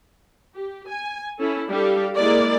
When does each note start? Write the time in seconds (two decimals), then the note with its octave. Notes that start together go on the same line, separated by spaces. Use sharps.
0.56 G4
0.90 G#5
1.39 C#4 E4 A4
1.71 G3 D4 G4 A4 F5
2.18 G#3 A#3 E4 G#4 A#4 D5